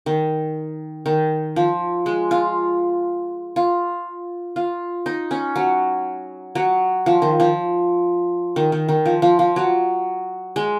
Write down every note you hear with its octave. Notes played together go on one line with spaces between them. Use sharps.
D#3
D#3
F3
G#3
F4
F4
F4
D#4
C#4
F#3
F#3
F3
D#3
F3
D#3
D#3
D#3
F3
F3
F3
F#3
G#3